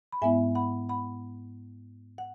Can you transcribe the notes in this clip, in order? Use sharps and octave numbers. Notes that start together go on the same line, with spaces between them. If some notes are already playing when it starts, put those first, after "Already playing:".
B5
G#2 G#3 B3 E4 E5 G#5
F#5 B5
F#5 B5
F#5